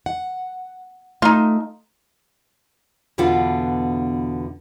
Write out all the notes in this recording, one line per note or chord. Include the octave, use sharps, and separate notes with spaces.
F#5
A3 D#4 F4
E2 B2 D3 D4 F4 F#5